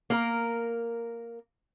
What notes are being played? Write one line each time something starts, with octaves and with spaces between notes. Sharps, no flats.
A#3 A#4